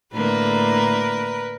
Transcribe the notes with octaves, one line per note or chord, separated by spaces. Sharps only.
A2 D3 A#3 A#4 B4